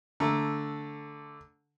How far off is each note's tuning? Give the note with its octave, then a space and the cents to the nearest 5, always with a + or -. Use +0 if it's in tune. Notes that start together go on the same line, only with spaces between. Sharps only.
D3 -10 A3 +0 A#5 +0